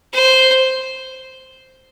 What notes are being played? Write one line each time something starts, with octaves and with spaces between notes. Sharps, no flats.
C5